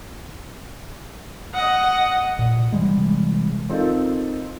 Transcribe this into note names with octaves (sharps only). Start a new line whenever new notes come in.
D#5 F#5
A#2
C3 E3 G3 G#3
C4 D#4 F4 A4 A#4